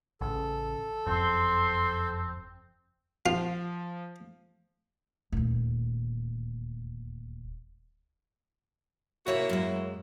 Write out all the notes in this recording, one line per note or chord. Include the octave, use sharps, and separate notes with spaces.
A1 C#3 A4
F#1 F2 C4 C6
F3 F4
D#1 D2
C3 A#3 E4 F#4 C#5 E5
F#2 G#3